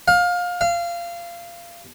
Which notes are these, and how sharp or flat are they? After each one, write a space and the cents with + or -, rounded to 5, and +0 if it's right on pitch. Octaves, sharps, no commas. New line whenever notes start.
F5 +25
F5 -20